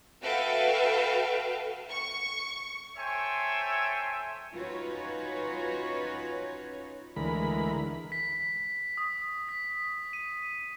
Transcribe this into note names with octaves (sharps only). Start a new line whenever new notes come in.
F#4 A4 B4 E5 F5 G5
C#6
A4 C5 C#5 E5 G5 G#5
C#4 D#4 F4 F#4 B4 C#5
D2 E3 G#3 A#4 B5
B6
D#6
B6
D#7